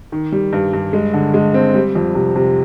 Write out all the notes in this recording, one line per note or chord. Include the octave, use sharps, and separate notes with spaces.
D#3
G3
G2
G2
G#3
D3
G#3
C4
G3
F2
C3
C3